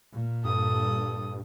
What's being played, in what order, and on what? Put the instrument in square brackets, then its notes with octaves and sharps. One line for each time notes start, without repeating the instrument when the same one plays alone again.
[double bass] A#2
[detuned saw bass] G2 [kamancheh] A4 D#6